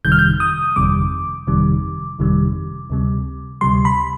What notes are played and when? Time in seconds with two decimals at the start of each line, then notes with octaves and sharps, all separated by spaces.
0.05 G1 F2 C3 D#3 G3 G6
0.12 F6
0.19 G6
0.40 D#6
0.76 G1 F2 C3 D#3 G3 D6
1.47 G1 F2 C3 D#3 G3
2.19 G1 F2 C3 D#3 G3
2.90 D2 C3 G3
3.61 D2 C3 G3 C6
3.85 B5